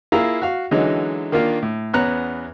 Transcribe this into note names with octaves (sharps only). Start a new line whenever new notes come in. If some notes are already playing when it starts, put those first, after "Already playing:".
A#3 E4 F4 G#4 F5 A#5
F#4 F5
D3 E3 F#3 G#3 C#4 D#4
D#3 A#3 D4 F4
A2
E2 B3 C#4 A#5 F#6